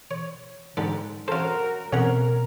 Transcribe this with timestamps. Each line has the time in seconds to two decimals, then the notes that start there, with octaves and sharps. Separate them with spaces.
0.11 C#5
0.77 G#2 D3 G3 A4
1.28 F#2 C#4 F#4 A4 A#4 C5 F5
1.93 C2 F2 B2 C#4 A#4 F#5 A#5